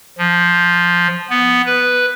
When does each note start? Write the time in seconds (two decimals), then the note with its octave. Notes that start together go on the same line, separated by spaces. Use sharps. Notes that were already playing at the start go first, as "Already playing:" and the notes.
0.18 F3
1.30 B3
1.66 B4